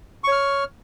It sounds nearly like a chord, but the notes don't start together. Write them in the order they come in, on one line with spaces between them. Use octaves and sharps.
C#6 C#5 F6